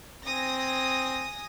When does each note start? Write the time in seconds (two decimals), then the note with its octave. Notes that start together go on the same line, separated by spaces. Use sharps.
0.24 C4 G#5 D#6 A#6